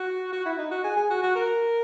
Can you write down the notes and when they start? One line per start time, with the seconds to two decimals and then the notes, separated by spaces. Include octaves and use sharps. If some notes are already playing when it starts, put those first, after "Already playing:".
Already playing: F#4
0.33 F#4
0.46 E4
0.58 D#4
0.71 F#4
0.84 G#4
0.96 G#4
1.10 F#4
1.23 F#4
1.36 A#4